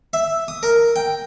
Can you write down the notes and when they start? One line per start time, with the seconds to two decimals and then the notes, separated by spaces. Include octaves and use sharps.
0.13 E5
0.48 D#6
0.63 A#4
0.96 G5